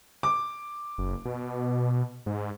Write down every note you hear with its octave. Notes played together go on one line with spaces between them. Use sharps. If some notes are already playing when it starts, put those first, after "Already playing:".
D6
F#1
B2
G#2